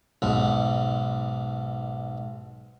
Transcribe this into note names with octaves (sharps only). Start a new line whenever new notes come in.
B1 G#2